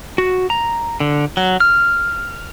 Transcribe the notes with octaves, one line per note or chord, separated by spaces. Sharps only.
F#4
A#5
D3
F#3
F6